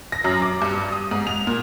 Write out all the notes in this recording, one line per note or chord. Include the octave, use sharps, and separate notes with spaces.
A#6
F#2
D6
G2
D#6
G#2
F7
A#2